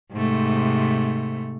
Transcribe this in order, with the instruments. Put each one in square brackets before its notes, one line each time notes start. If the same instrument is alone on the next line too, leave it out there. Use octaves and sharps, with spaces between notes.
[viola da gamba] G#2 C3 A3